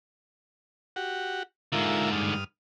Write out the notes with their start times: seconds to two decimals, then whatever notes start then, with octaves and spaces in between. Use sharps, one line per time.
0.96 F#4 G4 F#5
1.72 G#2 D3 F4 A#4 E5
2.13 G2 D#6 F6